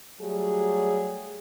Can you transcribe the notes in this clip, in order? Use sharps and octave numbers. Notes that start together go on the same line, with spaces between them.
F#3 G3 A3 G4 G#4